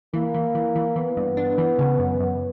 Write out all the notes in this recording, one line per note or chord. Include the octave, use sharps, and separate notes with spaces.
E3 A#3
E3
E3
E3
E3 B3
G2
D4
E3
C#3
F#2
F#2